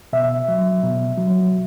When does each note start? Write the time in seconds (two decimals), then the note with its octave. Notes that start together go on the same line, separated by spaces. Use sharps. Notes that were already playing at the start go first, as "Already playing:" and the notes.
0.13 B2 E5
0.48 F#3
0.83 B2
1.18 F#3